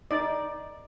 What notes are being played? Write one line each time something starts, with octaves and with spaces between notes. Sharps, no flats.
D#4 D5